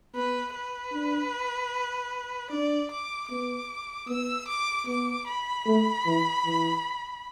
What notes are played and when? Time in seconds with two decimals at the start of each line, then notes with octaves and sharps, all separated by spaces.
0.15 B3 B4
0.54 B4
0.93 D4
2.51 D4 D5
2.91 D6
3.30 B3 D6
4.08 B3 E6
4.48 D6
4.87 B3 D6
5.27 B5
5.66 A3
6.06 E3
6.45 E3